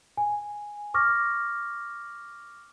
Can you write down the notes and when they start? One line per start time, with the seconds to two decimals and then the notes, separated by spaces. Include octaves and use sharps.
0.17 G#5
0.94 C#6 D6 F6 A#6